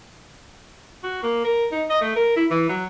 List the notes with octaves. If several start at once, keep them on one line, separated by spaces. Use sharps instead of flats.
F#4
A#3
A#4
D#4
D#5
A3
A#4
E4
E3
F#3